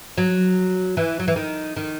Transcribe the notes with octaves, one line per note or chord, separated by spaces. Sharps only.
F#3
E3
F#3
E3
D#3
D#3